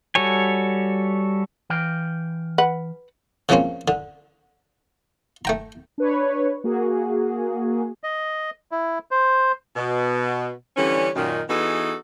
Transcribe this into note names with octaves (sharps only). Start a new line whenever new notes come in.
G3 F#4 A4 C#5 G#5
E3 F5 G5
B4 F#5
C#3 F3 G#3 A#3 C4 C#4
D3
A3 G5 A#5
D4 B4 C#5
A#3 F#4 G#4
D#5
E4
C5
B2
D3 E3 G3 C#4
F#2 A#2 D#3
E3 B3 D#4 F#4 G#4 A4